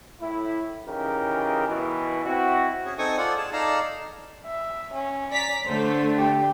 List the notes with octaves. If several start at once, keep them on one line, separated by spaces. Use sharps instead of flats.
A2 E4
C#3 E3 D#4 G4 A#4
B2 E3
C4 E4 F#4
C#4 G#4
C4 D#4 A4 G#5 C#6 D#6
F4 A4 D5 F#5
G#4 A5
D#4 A4 D5 F5 A5 A#5
E5
C#4
D5 A#5 B6
D3 A3 C5
G4